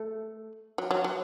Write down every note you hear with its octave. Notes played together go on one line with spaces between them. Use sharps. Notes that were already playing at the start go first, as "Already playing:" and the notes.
Already playing: A3
F#3
F#3
F#3